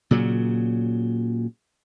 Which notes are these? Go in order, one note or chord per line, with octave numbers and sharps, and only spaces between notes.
A#2 C#3 F#3